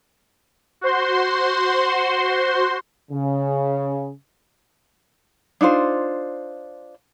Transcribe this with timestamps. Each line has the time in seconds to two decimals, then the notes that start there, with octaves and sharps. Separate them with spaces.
0.81 F#4 C5 C6
3.11 C#3
5.61 D4 D#4 F4 C5